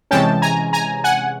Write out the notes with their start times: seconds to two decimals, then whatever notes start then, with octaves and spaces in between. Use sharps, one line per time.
0.11 C3 E3 G#3 C#4 G5 A5
0.42 G#5 A#5
0.73 G#5 A#5
1.04 F#5 G#5